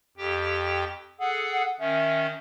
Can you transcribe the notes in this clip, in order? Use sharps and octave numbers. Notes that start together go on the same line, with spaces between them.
F2 G4 G5
G#4 A4 F#5
D#3 C#4 E5